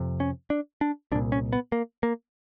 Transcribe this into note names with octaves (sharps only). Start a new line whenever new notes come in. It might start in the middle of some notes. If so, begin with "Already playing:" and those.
Already playing: F2 C3
C#4
D4
D4
C2 A#2 D4
C#4
B3
A#3
A#3